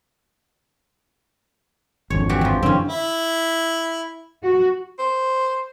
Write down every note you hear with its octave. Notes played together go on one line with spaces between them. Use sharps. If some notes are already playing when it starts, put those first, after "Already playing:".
G#1 F2 D3 C#5
E3 F#4 G4
G2 F3
F#2 D3 E3 C4 C#4
E4
F#4
C5